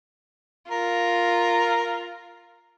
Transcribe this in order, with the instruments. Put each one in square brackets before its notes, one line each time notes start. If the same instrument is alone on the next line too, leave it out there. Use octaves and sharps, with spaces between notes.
[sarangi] F4 [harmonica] A#4